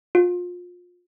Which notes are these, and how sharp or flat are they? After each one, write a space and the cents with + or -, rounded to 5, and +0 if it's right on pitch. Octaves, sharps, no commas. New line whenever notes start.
F4 +30